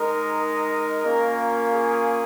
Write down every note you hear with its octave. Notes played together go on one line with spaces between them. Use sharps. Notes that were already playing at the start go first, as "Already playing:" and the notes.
Already playing: G#3 D#4 A#4
A#4
A#3 C#4 F4
G#4